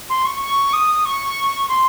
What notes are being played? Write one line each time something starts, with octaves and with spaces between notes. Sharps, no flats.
C6
C#6
C#6
D#6
C#6
C6